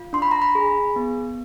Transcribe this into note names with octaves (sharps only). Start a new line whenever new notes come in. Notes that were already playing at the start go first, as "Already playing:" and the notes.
Already playing: F4
D4 C6
B5
A#5
B5
G#4
B3